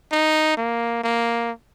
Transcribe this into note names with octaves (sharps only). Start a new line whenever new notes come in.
D#4
A#3
A#3